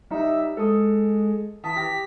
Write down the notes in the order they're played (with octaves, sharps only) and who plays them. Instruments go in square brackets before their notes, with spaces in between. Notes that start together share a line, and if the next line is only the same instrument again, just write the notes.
[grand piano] G3 D#4 [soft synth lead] E5
[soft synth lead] G#3 [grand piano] A4 D#6
[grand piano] E3 A5 D#6 [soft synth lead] B6
[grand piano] G4 A#6